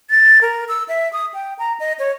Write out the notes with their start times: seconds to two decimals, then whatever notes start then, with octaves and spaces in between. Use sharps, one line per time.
0.10 A6
0.41 A#4
0.68 E6
0.88 E5
1.13 D#6
1.34 G5
1.59 A#5
1.80 D#5
1.99 C#5